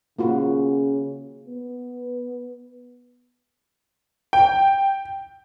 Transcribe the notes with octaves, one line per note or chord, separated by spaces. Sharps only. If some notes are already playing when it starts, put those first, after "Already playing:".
C#3 A#3 F4 F#4
B3
G5